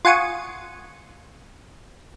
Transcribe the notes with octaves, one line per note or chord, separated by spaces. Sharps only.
F4 F#5 G#5 C#6 D#6